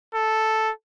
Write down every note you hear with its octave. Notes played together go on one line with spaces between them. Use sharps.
A4